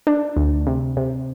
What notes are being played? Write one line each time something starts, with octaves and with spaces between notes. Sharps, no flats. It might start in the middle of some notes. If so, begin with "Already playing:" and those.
D4
D2
C3
C3